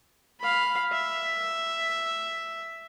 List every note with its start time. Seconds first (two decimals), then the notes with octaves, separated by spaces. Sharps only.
0.40 F5 B5
0.93 E5